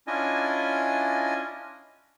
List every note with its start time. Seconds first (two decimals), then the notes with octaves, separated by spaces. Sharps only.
0.07 C#4 D4 E4 F4 D#5 G#5